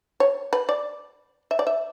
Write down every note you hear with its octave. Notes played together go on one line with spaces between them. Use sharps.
C#5
B4
D5
E5
D5
E5